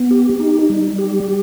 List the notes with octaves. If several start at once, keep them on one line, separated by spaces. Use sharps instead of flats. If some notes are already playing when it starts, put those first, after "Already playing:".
Already playing: B3
G4
D#4
G3
G4